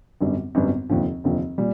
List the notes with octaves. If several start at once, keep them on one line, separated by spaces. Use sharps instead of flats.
G#1 F#2 D3 G3 B3
G#1 F#2 D3 G3 B3
F1 D#2 D3 F3
F1 D#2 D3 F3
A#2 G3